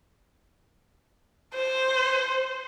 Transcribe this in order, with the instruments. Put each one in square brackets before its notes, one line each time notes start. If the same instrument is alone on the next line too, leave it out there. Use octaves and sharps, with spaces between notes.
[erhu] C5